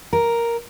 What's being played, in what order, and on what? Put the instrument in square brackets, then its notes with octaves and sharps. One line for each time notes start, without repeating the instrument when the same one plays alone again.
[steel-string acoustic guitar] A#4